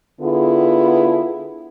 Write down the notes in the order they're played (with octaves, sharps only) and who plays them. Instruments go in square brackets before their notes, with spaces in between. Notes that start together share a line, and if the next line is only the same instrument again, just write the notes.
[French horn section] D3 B3 E4 F4 G#4